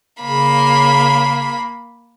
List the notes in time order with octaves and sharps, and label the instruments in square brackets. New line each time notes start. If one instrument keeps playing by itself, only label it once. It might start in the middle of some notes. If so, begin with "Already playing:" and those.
[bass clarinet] C#3 [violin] A#3 B5